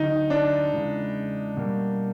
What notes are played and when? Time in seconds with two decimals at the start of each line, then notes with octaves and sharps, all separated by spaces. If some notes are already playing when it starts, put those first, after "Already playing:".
Already playing: D2 D3 F#3 D#4
0.30 D4
0.74 E2 C#3 E3 G#3
1.57 B2 G3 A#3